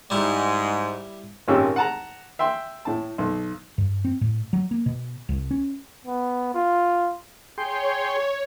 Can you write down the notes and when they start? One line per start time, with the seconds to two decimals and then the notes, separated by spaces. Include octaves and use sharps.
0.10 G#2 G3 E4
1.48 G#1 A#2 A#3 C#4 G4 E6
1.76 F#5 A5 A#5
2.39 E5 G5 C6
2.85 A2 A5
3.18 B1
3.78 G2
4.05 C4
4.21 A2
4.53 F#3
4.71 A#3
4.86 B2
5.29 C2
5.51 C#4
6.05 B3
6.54 F4
7.58 G#4 C#5 G5 C6